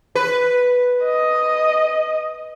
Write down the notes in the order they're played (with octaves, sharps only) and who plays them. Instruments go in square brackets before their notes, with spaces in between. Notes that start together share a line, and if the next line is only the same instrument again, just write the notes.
[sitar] B4
[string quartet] D#5